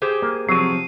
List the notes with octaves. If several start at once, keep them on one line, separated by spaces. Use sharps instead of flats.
G4 G#4 C5
A#3
C3 F3 F#3 C7 D#7